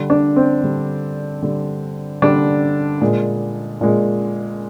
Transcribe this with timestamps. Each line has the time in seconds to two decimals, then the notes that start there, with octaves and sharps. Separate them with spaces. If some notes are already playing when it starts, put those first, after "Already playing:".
Already playing: D3 G3
0.10 D4
0.36 C4
0.63 D3 G3
1.42 D3 G3
2.22 D3 G3 D4
3.01 A#2 G#3
3.81 A#2 G#3